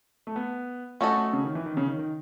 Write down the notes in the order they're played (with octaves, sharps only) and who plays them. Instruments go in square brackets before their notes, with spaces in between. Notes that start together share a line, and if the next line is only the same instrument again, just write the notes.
[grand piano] A3
B3
[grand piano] A3 [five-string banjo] C#4 F#4 A4 D#5
[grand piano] A3
C#3
D#3
E3
D#3
C#3
D#3
D#3